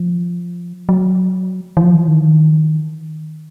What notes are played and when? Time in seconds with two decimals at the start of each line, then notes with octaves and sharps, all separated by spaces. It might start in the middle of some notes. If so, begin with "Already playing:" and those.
Already playing: F3
0.89 F#3
1.77 E3
1.82 F3
1.95 E3
2.08 D#3